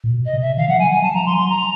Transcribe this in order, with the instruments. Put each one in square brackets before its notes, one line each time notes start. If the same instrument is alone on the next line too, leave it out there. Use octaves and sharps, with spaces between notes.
[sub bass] A#2
B2
[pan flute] D#5
[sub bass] C3
[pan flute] E5
[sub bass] D#3 [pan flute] F5
[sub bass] F3 [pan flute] F#5
[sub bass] F#3 [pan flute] G#5
[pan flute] G#5
[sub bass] F#3 [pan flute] A5
[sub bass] F3 [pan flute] A#5
[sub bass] F#3
[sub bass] F3 [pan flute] C6
[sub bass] F#3 [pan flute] C6
[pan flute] A#5